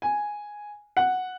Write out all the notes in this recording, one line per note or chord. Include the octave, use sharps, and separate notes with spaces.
G#5
F#5